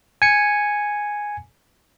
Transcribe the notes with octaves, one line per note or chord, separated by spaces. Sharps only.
G#5 C#7